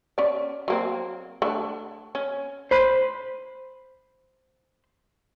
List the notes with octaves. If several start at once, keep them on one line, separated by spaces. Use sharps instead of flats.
C#4 D5
F#3 A#3 C4
A3 D4
C#4
C5 B5